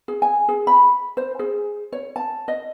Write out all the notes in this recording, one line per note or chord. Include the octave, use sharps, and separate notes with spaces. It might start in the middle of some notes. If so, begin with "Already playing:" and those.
G#4
G#5
G#4
B5
C5
G#4
C#5
A5
D#5